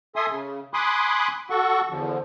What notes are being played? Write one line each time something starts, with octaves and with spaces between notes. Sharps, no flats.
A4 E5 G#5 C6 D#6
C#3
G#5 B5 C6 D6 D#6 F#6
F#4 A4 F#5 C#6
E2 D3 F3